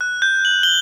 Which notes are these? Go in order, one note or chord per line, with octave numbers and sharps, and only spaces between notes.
F#6
G6
F#7
G7